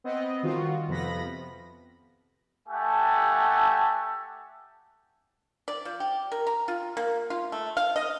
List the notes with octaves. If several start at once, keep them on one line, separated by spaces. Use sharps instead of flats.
B3 C4 D#5
D#3 G3 F4 F#4
F2 C3 F3 B3 B5 A#6
A3 G4 A4 F#5 G#5
D5
F3
G4
A#4
A#5
F4
A#3
F4
A3
F5
D#5